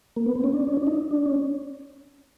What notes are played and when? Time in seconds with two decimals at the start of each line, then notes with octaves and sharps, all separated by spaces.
0.16 A#3
0.26 B3
0.35 C4
0.44 C#4
0.53 D4
0.67 C#4
0.77 D4
0.87 D#4
1.11 D4
1.25 C#4